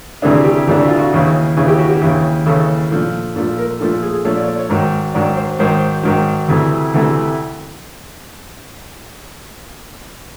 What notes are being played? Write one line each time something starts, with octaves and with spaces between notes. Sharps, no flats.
D2 C3 E3 A3 D4 G#4
G4
D2 C3 E3 A3 D4 G4
F#4
F4
F#4
D#2 C#3 E3
D#2 C#3 E3 G#4
G4
F#4
G4
D#2 C#3 E3
D#2 C#3 E3 A4
A#2 F3 A3
A#2 F3 A3 A4
A#4
A#2 F3 A3 A4
G#4
A#2 F3 A3 C#5
D5
C#5
D5
C#5
G#2 D#3 F#3
G#2 D#3 F#3 D5
C5
G#2 D#3 F#3 C5
G#2 D#3 F#3
D2 C3 E3 A3
D2 C3 E3 A3